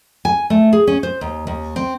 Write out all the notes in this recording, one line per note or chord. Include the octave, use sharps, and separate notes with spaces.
G#5
A3
G#4
C#4
C5
D#2
D#2
C4